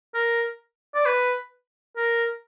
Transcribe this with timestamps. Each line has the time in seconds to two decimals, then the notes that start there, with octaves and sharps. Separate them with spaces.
0.14 A#4
0.95 D5
1.06 B4
1.97 A#4